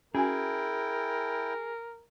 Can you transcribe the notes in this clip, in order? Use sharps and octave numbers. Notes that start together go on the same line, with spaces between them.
C#4 E4 F#4 G#4 A#4 G5 G#5